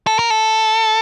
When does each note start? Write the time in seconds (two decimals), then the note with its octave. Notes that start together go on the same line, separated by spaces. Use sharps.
0.07 A4
0.19 A#4
0.30 A4